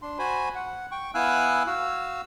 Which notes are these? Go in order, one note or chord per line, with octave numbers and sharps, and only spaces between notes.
D4 C6
F#4 C5 G#5 B5
F#5
G5 C#6
B3 E4 F5 G#5 E6 F#6
F#4 F5 E6